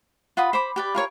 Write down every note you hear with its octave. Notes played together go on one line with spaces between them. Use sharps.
F4 F#5 B5 D#6
C5 B5 D6
G4 B4 D5
F4 A#4 C#5 C#6